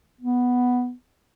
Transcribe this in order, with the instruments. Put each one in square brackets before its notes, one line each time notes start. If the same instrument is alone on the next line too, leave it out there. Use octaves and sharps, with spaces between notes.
[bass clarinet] B3